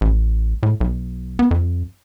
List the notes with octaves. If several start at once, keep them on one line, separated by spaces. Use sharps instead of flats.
A1
A2
B1
B3
F2